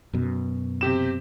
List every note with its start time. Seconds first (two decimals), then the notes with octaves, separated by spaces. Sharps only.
0.14 F#2 B2
0.81 C3 G4 E7